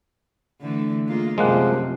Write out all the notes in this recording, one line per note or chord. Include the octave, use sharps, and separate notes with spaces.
D3 E3 A3
G#3 A#3 F4
F#2 C3 F3 G#3 A#3 F#5